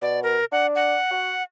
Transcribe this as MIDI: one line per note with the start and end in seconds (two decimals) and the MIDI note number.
0.02 0.37 47
0.02 0.20 74
0.23 0.45 70
0.52 0.96 62
0.52 0.67 78
0.75 1.43 78
1.11 1.35 66